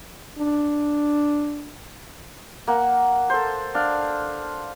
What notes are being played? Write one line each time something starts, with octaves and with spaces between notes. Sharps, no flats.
D4
A#3 F#5
A4 C5
D4 F5